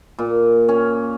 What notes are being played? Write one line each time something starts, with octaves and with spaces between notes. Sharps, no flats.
A#2
C#4